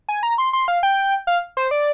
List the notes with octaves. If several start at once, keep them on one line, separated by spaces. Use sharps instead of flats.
G#5
A#5
C6
C6
F5
G5
F5
C5
D5